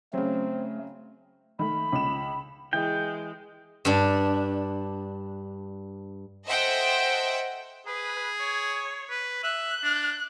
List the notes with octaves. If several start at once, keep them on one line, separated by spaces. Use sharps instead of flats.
C#3 F#3 A3 C4
D#3 A3 B5
C#2 E7
E3 G#3 G5
G2 D4
A4 C5 D#5 E5 F#5 G5
G#4 B4
C#5
B4
E5 F#6
D4